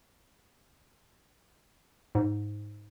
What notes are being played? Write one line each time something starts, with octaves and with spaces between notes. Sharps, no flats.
G#2